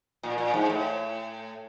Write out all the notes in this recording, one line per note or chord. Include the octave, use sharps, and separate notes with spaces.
A#2
A#2
G#2
A2